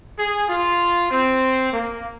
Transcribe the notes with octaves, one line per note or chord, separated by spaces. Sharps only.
G#4
F4
C4
A#3